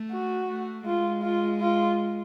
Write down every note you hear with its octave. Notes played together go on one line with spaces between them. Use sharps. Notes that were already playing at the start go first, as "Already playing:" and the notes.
Already playing: A3
F#4
A3
G#3 F4
F4
F4